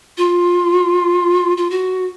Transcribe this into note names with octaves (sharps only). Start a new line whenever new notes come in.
F4
F4
F#4